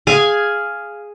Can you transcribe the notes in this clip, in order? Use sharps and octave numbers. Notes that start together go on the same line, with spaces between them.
G#4 F5 G#5